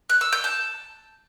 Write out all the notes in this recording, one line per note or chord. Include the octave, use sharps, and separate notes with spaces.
F#6
E6
G6
A5